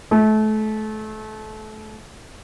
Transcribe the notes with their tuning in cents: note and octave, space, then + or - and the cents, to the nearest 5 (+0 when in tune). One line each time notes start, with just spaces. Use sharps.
A3 -30